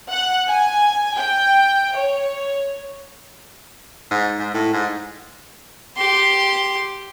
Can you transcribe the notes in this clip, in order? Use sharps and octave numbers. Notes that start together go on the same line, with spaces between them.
F#5
G#5
G5
C#5
G#2
G#2
A2
G#2
G4 C6